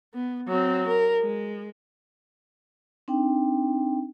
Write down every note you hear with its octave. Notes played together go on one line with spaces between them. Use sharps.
B3
F#3 C4
A#4
G#3
C4 D4 D#4 G5